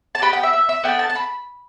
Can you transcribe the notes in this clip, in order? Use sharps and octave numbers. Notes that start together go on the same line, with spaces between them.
A5
B3 G4 B5
G5
E5
E5
E5
B3 D4 A4 G5
A5
A5
B5